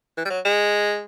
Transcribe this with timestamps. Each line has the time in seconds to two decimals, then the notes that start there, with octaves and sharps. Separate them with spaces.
0.17 E3
0.25 G3
0.30 F#3
0.45 G#3